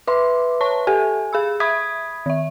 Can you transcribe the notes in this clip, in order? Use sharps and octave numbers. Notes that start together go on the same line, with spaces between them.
B4 E5 C6 D6
C#5 A5 C#6
G4 A4 G#5
G#4 B5 E6
E5 B5 D#6 G#6 B6
D#3 E5